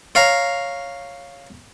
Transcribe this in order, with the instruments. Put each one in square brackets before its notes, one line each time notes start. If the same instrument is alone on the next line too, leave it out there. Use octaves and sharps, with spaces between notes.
[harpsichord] C#5 F5 A#5